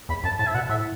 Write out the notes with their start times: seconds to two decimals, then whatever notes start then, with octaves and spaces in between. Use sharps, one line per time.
0.09 E2 B5
0.24 F#2 A5
0.39 A2 A5
0.47 E5
0.55 B2 F#5
0.69 A2 E5